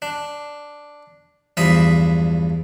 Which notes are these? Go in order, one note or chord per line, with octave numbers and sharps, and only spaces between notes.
D4
E2 G2 F3 E5 B5 D#6